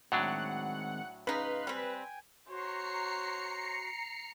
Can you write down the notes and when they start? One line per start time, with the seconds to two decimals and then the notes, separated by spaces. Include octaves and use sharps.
0.12 A2 D#3 F#3 G#3 C4 D4 F#5
1.27 C#3 D#4 B4 F5 C6
1.67 G3 C4 G5 G#5
2.48 F#4 C5 C#5 A#5 C7 C#7